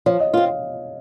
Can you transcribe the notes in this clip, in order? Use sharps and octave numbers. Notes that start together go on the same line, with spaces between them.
F3 C#5
D#5
C4 F4 F5